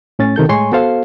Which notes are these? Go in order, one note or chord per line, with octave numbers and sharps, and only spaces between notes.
A2 C#4 A6
C3 D#3 A4 G6
A2 G#3 C#5 G#5 C6 C#6
B3 F#4 A4 C5 F5